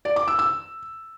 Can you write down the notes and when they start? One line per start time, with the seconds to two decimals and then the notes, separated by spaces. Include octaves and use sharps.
0.05 D5
0.16 D6
0.28 E6
0.39 E6